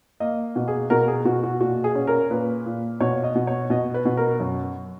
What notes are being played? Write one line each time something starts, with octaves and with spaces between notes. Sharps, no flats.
A#3 D#5
B2
G#4
B2 A#4
G#4
B2 F#4
F#4
A#2 F#4
G#4
C#4
A#4
A#2 B4
A#2
B2 C#5
D#5
B2
C#5
B2 D#5
B4
B2
A#4
F#2